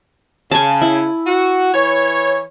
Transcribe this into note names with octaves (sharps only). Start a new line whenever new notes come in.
C#3 G#5 A5
E4
F#4
E3 B4 C#5